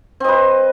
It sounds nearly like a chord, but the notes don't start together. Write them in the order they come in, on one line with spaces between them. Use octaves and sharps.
C4 D#5 B4